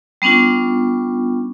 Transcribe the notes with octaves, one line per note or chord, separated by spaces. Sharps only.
G3 B3 C#4 D4 F4